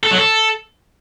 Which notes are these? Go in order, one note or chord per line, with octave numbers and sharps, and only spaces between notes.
A4
F#3
A4